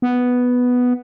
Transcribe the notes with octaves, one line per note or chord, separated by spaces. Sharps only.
B3